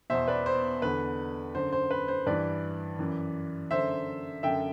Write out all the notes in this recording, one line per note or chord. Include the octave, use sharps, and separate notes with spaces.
E2 B2 C5 E5
B4 D5
C5
E2 D3 B4
F#2 D3 C5
C5
B4
C5
G2 E3 B4 D5
F#2 E3
F#2 D3 C5 E5
F#2 D3 E5 G5